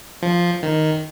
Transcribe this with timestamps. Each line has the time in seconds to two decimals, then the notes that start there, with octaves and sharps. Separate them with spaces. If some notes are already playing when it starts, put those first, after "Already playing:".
0.23 F3
0.63 D#3